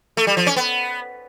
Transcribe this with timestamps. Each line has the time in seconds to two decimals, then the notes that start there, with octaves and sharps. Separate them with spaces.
0.17 A3
0.27 G3
0.37 F3
0.47 C#4
0.56 B3